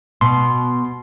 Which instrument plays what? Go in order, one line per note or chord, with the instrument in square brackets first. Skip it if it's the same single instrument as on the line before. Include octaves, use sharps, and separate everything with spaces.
[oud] B2 [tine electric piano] C6